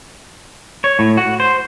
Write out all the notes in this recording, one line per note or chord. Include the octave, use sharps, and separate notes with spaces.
C#5
A2
F#4
C5